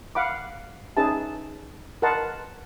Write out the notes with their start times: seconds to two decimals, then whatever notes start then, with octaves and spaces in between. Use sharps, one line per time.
0.15 F5 F#5 B5 D6
0.97 C#4 D#4 G#4 B4 E5 A5
2.02 A#4 B4 D#5 F#5 A5 C6